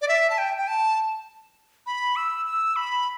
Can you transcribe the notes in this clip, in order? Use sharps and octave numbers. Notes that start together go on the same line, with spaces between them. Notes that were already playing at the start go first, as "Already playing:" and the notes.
D5
E5
A5
G5
G5
A5
B5
E6
E6
B5